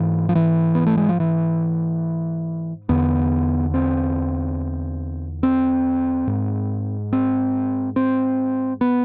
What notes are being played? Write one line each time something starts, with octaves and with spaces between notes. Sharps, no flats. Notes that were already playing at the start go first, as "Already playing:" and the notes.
Already playing: G#2 E3
F3
E3
B3
A3
G#3
F3
E3
E2 D3 B3
C4
C4
G#2
C4
C4
B3